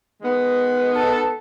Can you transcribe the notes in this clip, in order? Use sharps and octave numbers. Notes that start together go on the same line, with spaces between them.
D#3 G#3 B3
A4